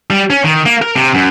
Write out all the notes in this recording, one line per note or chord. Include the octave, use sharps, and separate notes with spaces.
G3
C#4
D#3
A#3
A#4
C3
F#2